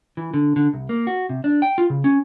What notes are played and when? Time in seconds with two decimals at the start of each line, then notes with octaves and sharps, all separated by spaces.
0.17 E3
0.34 D3
0.56 D3
0.73 C2
0.89 A#3
1.07 F#4
1.29 C3
1.44 D4
1.62 G5
1.78 F4
1.90 C#3
2.04 C#4